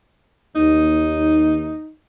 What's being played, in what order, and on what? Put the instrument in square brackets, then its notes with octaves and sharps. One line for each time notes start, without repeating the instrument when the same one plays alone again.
[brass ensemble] D#2 [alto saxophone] D#4